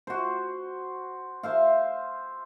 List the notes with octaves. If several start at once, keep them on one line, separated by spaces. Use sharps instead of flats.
F#4 C5
C5 E5 F5